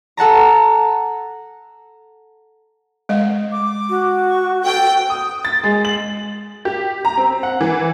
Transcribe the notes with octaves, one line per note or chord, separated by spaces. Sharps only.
A4 F#5 A5 A#5
G#3 D#5 F5
D6
F#4
C#6
A4 G5
D#6
A6
G#3
F#7
G4
A#5
C4
F#5
E3